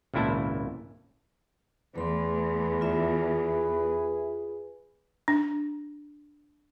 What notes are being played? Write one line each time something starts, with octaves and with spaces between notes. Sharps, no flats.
G#1 C#2 A#2 E4 E5 A5
E2 A3 G#4 B4 C6
F4 E5
D4